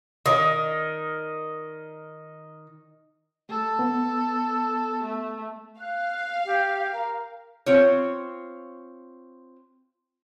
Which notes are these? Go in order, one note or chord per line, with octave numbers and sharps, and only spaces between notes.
D#3 D#5
A3 A4
B3
A3
F5 F#6
G4
A#4
C4 F4 C#5